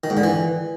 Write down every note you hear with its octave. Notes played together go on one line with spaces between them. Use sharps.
D#3
G#2
D3
E3